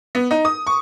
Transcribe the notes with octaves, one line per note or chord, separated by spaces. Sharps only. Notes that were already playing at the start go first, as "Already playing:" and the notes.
B3
D#4
D#6
C#6